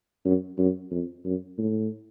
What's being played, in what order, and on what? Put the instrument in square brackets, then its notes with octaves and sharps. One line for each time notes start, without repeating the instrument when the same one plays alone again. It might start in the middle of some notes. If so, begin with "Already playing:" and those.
[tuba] F#2
F#2
F2
F#2
A2